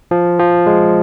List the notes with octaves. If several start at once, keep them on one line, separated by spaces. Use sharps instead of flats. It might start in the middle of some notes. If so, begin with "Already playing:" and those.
F3
F3
G#3